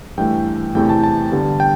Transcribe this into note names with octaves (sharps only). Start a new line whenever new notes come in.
G2 E3 A3 G5
E2 C3 E3 A3 G5
A5
A5
G2 D3 G3 B3
G5